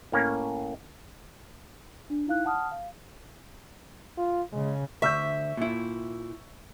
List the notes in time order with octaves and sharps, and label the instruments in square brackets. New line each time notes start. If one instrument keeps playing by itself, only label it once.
[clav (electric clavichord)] A2 A#3 C#4
[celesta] D4
D#4 E4 F5 F#6
F#5 A5 D#6 F6
F5
[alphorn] F4
[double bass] C#3 [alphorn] G#3
[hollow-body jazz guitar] D2 [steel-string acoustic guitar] E5 [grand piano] C#6 E6 G6
[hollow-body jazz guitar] A#2 E4